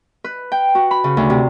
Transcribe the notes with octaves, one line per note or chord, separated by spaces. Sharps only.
B4
G5
F#4
B5
C#3
D2
C3